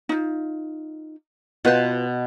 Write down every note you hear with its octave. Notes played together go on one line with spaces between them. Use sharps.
D#4 F4
B2 F4 B4 C5 A5